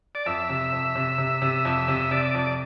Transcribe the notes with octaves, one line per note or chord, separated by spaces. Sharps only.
D5
F2 E5
C3
F2
C3
C3
C3
F2
C3
C3 D5
F2